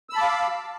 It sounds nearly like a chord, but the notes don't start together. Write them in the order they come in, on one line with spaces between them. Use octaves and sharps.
E6 B5 A5 D6 F5